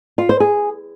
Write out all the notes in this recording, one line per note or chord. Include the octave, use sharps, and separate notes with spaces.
F4
C5
G#4